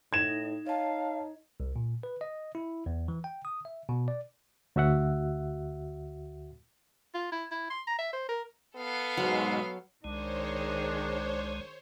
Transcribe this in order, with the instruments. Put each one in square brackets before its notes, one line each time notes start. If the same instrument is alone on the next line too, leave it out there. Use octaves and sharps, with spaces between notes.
[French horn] A2 [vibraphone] D#4 [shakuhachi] D#5 [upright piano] G#6 E7
[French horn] D#4 [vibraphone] C#5 A5 [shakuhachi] F5
[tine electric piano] C2
A#2
B4
D#5
E4
E2
E3
G5
D#6
E5
B2
D5
[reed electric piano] D2 F#4 E5 F#5
[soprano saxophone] F4
E4
E4
C6
A#5
E5
C5
A#4
[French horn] B3 [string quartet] A4 F5
[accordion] G#2 B2 G#3 [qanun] F#3
[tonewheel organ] C2 G#3 [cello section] D#3 G#4 [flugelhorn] D4 [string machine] C5 C#5